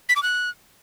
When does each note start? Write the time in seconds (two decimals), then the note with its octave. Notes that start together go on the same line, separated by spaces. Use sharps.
0.09 B6
0.16 D6
0.23 F#6